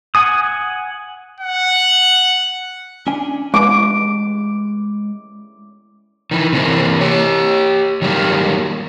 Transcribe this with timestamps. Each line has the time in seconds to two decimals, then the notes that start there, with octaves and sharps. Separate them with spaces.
0.15 F#5 G#5 D#6
1.40 F#5
3.07 C#4 D4 G#5
3.54 G#3 D6
6.31 D#3 E3
6.53 C3 E3 A#3
7.01 G4 C#5
8.02 D#3 F#3 G3 A#3